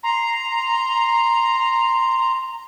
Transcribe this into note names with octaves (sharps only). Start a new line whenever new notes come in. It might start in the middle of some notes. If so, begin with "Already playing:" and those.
A#5 C6